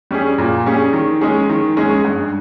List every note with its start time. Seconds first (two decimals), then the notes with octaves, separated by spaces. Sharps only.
0.11 G3 C#4 G#4
0.38 A#2
0.66 G3 C#4 G#4
0.93 D#3
1.21 G#3 C#4 G#4
1.49 D#3
1.77 G#3 C#4 G#4
2.05 G2